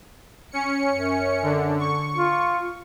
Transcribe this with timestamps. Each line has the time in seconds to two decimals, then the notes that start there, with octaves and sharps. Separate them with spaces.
0.51 C#4 C#7
0.91 F#2
1.43 D3
1.79 C#6
2.16 F4